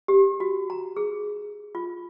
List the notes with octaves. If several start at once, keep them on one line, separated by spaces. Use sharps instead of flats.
G4
F#4
A#5
G#4
F4